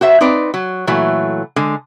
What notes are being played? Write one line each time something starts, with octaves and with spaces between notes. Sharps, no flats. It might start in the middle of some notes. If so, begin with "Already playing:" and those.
F#4 C5 E5
C4 D#4 B4 D5
F#3
A#2 E3 F#3 A3
D3 G#3